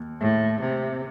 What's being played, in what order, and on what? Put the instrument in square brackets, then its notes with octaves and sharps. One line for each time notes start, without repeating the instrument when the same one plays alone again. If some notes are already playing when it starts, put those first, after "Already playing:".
Already playing: [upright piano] D#2
[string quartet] A2
C3